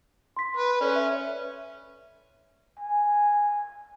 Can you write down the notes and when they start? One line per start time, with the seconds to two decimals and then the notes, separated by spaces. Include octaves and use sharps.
0.37 C6 B6
0.57 B4
0.81 C#4 A4 B4 D5
0.96 E5
2.79 G#5